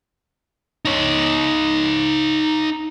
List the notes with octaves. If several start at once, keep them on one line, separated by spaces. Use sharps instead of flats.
D#4 C#5